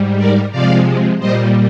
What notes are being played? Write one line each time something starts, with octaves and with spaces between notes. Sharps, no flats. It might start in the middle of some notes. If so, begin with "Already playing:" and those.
Already playing: G#2 G3
A#4 D5
C3 F3 G#3 D5 F5
A#2 G3 C5 D#5